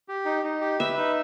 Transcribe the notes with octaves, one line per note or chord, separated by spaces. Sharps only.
G4
D#4
D#4
G4
B4 E5
D#4